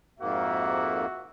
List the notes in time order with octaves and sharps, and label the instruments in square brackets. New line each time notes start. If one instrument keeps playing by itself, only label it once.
[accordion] F2 G#2 A#3 [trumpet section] F#4 E5